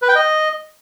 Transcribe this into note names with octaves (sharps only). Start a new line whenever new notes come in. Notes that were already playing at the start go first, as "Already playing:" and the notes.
B4
G5
D#5